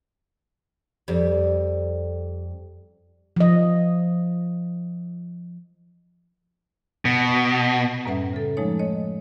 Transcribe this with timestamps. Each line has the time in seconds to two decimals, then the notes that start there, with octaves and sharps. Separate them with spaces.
1.08 F2 G3
3.36 F3 D#5
7.05 B2
8.05 F#2 A2 G3 C#4 B4 E5
8.33 C#3 A4
8.57 F3 G#3 A3 D#4 C#5
8.79 C#5 D#5